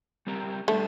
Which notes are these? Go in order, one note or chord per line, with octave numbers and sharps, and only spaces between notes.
G3 C4 G4 A#4
G3 A3 D4 G4 C5